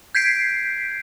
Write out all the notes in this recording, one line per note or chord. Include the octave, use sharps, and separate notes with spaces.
G6 G#6 B6 C7 D7